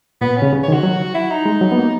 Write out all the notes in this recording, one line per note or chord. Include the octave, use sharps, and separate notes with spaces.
A#2 B3
C#4
C#3
C#3
C#5
D#3
F#4
F#3
E4
D#4
G#3
F#3
B3
A#3